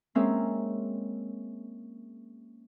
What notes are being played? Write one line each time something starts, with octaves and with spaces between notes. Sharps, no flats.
G#3 A#3 C4 C#4 A#4 E5